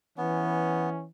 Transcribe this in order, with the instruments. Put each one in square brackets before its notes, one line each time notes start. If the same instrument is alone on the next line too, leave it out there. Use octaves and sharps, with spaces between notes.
[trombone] E3 [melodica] B3 [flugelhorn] C#4